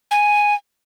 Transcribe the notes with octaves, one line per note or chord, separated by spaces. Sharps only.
G#5